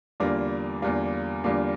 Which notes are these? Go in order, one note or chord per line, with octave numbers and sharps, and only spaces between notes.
E2 D3 G3 A#3 F4
E2 D3 G3 A#3 F4
E2 D3 G3 A#3 F4